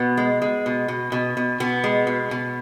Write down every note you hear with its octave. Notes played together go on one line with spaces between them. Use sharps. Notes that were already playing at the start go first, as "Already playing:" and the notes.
Already playing: B2 B3
G#3
G#3
B2
B2
B2
B2
B2 B3
G#3
B2
B2